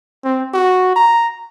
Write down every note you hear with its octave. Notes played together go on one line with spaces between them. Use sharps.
C4
F#4
A#5